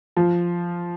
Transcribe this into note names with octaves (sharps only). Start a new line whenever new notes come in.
F3